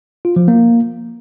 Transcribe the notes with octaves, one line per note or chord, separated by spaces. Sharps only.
F4
F3
A#3